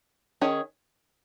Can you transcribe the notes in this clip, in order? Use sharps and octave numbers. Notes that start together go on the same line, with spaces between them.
D#3 C#4 G#4 C#5